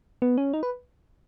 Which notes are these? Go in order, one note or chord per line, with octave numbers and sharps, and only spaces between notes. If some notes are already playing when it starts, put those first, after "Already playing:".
B3
C#4
D#4
B4